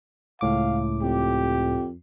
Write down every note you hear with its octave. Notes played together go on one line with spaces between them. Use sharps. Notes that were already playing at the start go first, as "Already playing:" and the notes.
C#2 A2 F5 D6
F2 G4